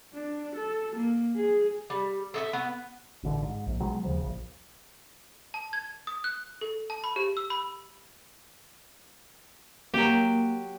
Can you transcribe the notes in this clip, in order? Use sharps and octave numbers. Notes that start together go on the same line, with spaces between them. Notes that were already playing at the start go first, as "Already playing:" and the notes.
D4
A4
A#3
G#4
G3
A4 D#5 E5
B3
A1 B2 D3
G#2
A#1
B2 F#3 G#3
D#2 C#3 F3
D#1 A#1
A5
G#6
D#6
F#6
A4
A5
B5
G4
E6
B5
F#3 A#3 G4